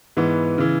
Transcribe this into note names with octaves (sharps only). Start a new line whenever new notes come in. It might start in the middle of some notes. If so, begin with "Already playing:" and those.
G#2 E3 B3
C#3 E3